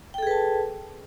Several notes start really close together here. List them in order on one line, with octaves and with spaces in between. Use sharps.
G5 A4 G#4 B4 A5